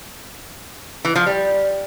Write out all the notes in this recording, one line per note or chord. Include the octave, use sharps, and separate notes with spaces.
E3
F3
G3